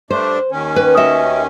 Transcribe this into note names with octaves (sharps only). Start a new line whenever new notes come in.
G2 A3 D4 C5
D#2 D#3 C#4
B4
F#4 D#5 E5